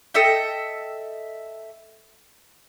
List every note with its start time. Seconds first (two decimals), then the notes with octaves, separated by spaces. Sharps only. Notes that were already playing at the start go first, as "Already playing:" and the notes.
0.14 A4 D#5 E5 G5